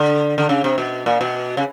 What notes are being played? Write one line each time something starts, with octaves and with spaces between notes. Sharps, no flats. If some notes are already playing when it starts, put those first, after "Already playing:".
Already playing: D3
D3
C#3
C3
B2
A#2
B2
C#3